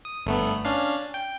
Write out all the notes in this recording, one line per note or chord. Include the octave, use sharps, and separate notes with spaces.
D#6
G1 A3 B3
C#4 D4 F5
G5